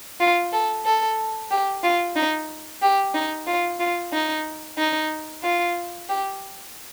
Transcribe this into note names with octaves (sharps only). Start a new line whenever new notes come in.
F4
A4
A4
G4
F4
D#4
G4
D#4
F4
F4
D#4
D#4
F4
G4